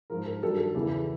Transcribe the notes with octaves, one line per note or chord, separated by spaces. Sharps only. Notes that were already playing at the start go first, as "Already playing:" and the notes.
G#2 F3 A#4
A#4
G2 D#3 F#3 A4
A4
E2 C#3 E3